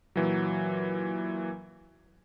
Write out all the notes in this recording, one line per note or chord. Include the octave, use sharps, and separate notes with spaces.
A#2 E3 F#3